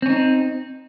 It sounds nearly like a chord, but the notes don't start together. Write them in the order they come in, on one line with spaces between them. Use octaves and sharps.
C4 C#4 D#4